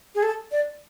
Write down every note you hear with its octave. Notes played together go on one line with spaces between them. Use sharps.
G#4
A4
D5